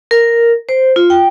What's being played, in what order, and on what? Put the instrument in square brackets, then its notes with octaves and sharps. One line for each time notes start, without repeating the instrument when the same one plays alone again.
[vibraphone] A#4
C5
F4
G5